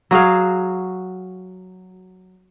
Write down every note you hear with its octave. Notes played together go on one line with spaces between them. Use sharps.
F#3 F#4 G#4 F5